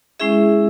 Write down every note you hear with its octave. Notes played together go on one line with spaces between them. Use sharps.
G#3 C#4 E4 G#4 E5